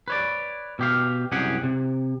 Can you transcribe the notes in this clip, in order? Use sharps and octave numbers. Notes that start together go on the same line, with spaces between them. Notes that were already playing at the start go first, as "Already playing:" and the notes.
B4 C#5 D5
B2 G4 F5
C2 F#2 G4 G#4 F#5
C3